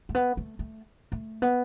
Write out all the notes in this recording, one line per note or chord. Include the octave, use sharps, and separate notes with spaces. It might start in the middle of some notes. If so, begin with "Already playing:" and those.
A3
B3
A3
A3
A3
B3